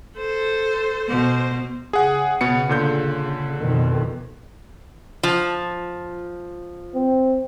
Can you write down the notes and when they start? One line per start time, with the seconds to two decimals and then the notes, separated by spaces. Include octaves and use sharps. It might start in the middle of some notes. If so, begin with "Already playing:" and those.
0.17 A4 C5
1.09 B2 C5
1.93 C#3 G#4 F#5
2.41 B2 B3 C#7
2.69 A#2 D3 G6
3.60 F2 B2 D#3
5.23 F3
6.95 C4